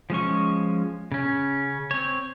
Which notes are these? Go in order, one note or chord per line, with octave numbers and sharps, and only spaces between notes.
F3 G#3 C#4 C#6
C#3 C#4
C4 C#5